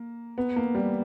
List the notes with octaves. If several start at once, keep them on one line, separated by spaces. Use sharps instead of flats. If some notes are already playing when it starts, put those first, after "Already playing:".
Already playing: A#3
B3
A#3
G3